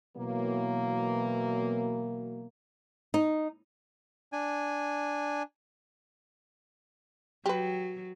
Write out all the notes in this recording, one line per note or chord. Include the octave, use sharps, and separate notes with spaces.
B2 E3 F#3 A#3
D#4
D4 G#5
F#3 G4 B4